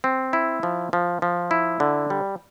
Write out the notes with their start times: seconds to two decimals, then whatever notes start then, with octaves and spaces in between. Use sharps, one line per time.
0.04 C4
0.33 E4
0.63 F3
0.93 F3
1.22 F3
1.51 E4
1.80 D3
2.10 G3